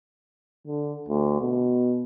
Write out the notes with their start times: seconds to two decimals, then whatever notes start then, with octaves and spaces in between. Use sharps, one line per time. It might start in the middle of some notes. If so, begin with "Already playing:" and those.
0.67 D3
1.09 D2
1.41 B2